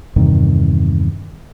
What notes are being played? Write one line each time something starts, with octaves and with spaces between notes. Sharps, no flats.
E2 G2 C3 D#3